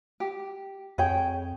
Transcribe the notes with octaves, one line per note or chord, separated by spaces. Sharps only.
G4
F2 G#4 C#5 G5